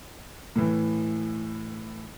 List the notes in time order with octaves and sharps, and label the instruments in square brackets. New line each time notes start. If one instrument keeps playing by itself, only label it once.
[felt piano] A2 E3